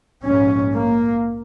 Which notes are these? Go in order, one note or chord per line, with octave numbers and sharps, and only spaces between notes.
A#1 G#2 C#4
A#3